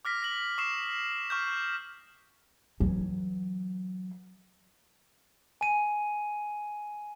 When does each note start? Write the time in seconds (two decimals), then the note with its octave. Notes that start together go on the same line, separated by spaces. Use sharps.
0.05 D6 F6 A#6 B6
0.22 A#6 F#7
0.58 C#6 D#6 C7 E7
1.30 C#6 F6 G6
2.80 E3 F#3
5.61 G#5 D#7